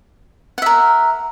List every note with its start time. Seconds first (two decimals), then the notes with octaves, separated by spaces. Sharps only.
0.58 F#5
0.62 E5
0.66 A#4